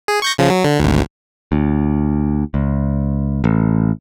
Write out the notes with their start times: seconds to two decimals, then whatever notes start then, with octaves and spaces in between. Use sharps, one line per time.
0.08 G#4
0.22 C#6 G6 A#6
0.38 C#3 F3
0.50 F#3
0.65 D3
0.79 G#1 D2
1.52 D2
2.54 C#2
3.44 A1